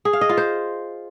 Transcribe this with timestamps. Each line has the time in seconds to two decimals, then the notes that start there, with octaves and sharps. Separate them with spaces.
0.05 G#4
0.13 F5
0.21 D#5
0.29 F4
0.37 C5